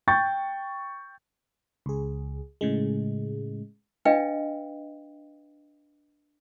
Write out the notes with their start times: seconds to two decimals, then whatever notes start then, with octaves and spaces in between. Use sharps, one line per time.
0.08 G5 C#6 G6 A6
1.86 C#2 G#4
2.61 A2 C#3 G#3
4.05 D4 B4 D#5 F5 G5